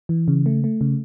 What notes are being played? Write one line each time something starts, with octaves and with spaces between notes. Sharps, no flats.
E3
C#3
A3
A3
C#3